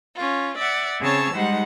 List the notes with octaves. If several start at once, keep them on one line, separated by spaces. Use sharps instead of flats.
C#4 F4
D5 E5 F#5
C#3 C4 G#4 C#5 A5 E6
G3 G#3 D#4 C5 F#5